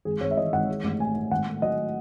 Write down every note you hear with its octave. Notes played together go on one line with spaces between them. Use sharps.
G#1 G#4
G#1 C#5
E5
E3 D#5
G#1 F#5
G#3
A1
A2 G#5
A2
G#1 F#5
A3
F#3 D#5